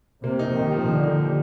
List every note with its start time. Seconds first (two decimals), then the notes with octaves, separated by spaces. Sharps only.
0.24 C3 A#3
0.39 D#4
0.55 D#3 G4
0.72 F3
0.87 D3 A#3
1.04 D#4
1.20 G4